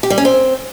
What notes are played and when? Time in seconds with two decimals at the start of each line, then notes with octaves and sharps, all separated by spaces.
0.03 G4
0.10 G3
0.18 C#4
0.25 C4